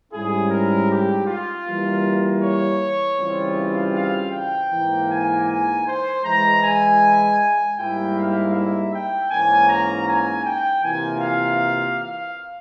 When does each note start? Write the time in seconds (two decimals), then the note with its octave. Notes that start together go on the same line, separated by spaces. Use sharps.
0.11 G#2 G3 C#4 E4 G#4
0.50 A#4
0.88 G4
1.27 F4
1.64 E3 G3 A#3
2.41 C#5
3.18 C#3 E3 G3 C4 F4
3.94 F5
4.32 G5
4.70 G#2 E3 A#3
5.09 G#5
5.47 G#5
5.86 C5
6.23 E3 G#3 E4 A#5
6.62 G#5
7.77 G#2 G3 A#3 E4 G5
8.15 F5
8.52 E5
8.92 G5
9.30 G#2 E3 A#3 C#4 G#5
9.68 A#5
10.06 G#5
10.45 G5
10.82 C3 E3 A#3 F4 G#5
11.21 F5
11.97 F5